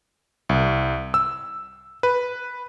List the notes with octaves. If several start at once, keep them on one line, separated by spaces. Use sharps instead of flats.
C2
E6
B4